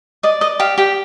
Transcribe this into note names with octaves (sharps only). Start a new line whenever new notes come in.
D5 D#5
D#5
G4 F5
G4 G5